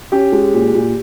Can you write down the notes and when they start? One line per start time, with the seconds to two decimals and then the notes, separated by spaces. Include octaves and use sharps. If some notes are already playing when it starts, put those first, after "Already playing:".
0.12 C#4 G4
0.32 G#3
0.54 A#2
0.74 A#2